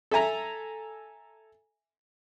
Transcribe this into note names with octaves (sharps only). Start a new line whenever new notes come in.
A4 E5 G#5 A#5